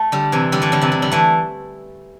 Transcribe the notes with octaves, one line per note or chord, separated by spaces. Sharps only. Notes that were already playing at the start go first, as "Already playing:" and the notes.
Already playing: A3
D3 G3
C3 E3
D3 G3
E3 A3
D3 G3
C3 E3
C3
D3 G3
E3 A3